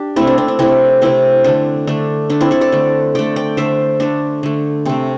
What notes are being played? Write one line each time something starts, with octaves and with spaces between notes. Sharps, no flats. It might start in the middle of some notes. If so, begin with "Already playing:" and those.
Already playing: D4 G4
C3 A3 C4 E4
D4
C4
D4
C3 A3 C4 E4
C3 A3 C4 E4
D3 A3 D4
D3 A3 D4
D3 A3 D4
C4 E4
E4 A4
A4 D5
D3 A3
D3 A3 D5 G5
D5 G5
D3 A3 C5 E5
D3 A3 D4
D3 A3
C3 A3 C4